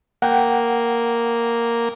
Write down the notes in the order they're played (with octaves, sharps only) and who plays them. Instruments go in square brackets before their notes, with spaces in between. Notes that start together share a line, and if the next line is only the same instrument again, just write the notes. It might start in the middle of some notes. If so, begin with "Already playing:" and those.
[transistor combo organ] A#3 [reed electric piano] F#5 G5